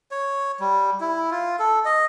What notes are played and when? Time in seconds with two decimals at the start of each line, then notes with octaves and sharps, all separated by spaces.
0.11 C#5
0.60 G3
1.01 E4
1.31 F4
1.59 A4
1.85 D#5